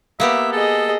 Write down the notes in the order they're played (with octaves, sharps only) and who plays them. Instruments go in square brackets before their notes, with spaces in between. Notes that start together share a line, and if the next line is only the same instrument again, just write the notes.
[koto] A#3 B3 G4 [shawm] E5
[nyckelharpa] G#4 D#5 [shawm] A4